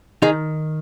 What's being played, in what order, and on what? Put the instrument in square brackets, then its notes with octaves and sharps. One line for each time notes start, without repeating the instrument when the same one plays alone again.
[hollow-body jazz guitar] D#3 D#4 G#4